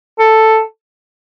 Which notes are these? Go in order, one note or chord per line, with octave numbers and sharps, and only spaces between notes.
A4